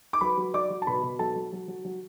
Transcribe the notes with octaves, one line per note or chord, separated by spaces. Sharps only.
D6
F#3 B4 B5
F#3
F#3 D5 D6
F#3
A5
B2 B4 B5
B2
F#3 A4 A5
F#3
F#3
F#3
F#3